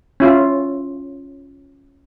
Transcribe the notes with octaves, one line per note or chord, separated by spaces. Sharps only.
C#4 E4 F4